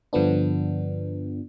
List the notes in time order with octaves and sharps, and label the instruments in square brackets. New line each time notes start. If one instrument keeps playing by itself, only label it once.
[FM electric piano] G2 D3 F3 B3 D4